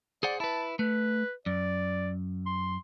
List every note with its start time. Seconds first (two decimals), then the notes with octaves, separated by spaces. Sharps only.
0.23 G#4 C5 D5 F#5
0.40 E4 B4 A5
0.79 A3 B4
1.46 F#2 D5
2.46 C6